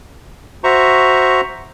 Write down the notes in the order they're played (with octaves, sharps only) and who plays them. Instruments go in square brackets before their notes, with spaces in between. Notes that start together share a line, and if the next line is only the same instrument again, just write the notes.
[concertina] F#4 C5 E5 A#5 C#6